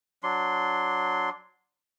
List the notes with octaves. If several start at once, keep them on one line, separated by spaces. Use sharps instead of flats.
F#3 D4 C6